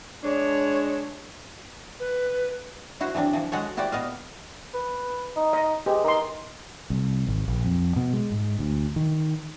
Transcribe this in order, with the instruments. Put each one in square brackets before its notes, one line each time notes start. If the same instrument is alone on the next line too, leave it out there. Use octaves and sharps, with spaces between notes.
[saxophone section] G#3 D4 [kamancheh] C#5
[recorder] B4
[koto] E4 F#4 C5
E3 F#3 C4 D4
E3 F3
G#3 F#4 A4 C#5
E4 F#4 G4 C5 D5
A#2 B3 D#5 F5
[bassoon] B4
D#4
[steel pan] D#5
[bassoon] G#3 [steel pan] G4 B4
[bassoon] D#4 [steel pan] A#4 C6
[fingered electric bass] C2
G#1
A#1
F2
B2
G#3
G#2
D2
D#3